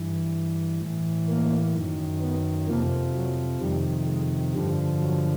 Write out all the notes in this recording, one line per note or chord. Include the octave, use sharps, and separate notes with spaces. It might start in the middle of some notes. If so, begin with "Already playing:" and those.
Already playing: G2 E3
A2 E3
A#3
F#2 D#3
B3
F2 C3 F3 A#3
F#3
F2 C3 D#3 G3
G#3
G2 D3 F3 G3
F#3